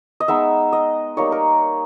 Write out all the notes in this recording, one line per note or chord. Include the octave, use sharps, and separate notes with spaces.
D#5
G#3 B3 D#4 E5
D#5
G3 A#3 D#4 C#5
A#4